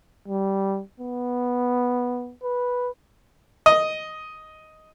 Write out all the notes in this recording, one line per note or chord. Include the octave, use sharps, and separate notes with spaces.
G3
B3
B4
D#5